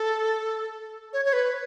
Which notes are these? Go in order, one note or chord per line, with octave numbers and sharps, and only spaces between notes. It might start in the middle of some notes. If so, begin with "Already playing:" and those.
Already playing: A4
C#5
C#5
B4